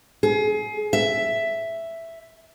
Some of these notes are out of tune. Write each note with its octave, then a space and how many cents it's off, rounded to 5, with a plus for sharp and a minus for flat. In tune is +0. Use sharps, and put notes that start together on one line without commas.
G#4 +30
E5 +5